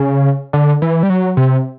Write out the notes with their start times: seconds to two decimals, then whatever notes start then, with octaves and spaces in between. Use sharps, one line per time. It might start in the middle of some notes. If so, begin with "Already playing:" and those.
Already playing: C#3
0.53 D3
0.82 E3
1.03 G3
1.10 F#3
1.37 C3